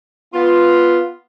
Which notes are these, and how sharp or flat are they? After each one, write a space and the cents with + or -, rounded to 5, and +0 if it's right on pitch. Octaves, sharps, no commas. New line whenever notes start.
B3 +0 F4 +0